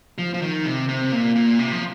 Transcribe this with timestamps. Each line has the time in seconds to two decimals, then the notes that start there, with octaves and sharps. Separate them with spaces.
0.18 F3
0.34 F3
0.42 D#3
0.65 C3
0.89 C3
1.12 A#2
1.35 A#2
1.59 C3
1.72 F3